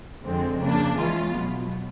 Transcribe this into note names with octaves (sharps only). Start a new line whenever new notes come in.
F2 D3 F3 G#3 C4
C#3 F3 A#3 D4
E3 G#3 C#4 F4
B2 F#3 B3